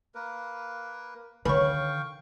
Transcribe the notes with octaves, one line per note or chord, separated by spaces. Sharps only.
A#3 A#4 B4
D3 D#3 B4 C#5 F5 G5 C#6